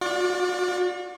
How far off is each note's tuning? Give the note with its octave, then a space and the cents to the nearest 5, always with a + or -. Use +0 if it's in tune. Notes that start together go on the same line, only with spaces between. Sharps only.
F#4 -45 D5 +0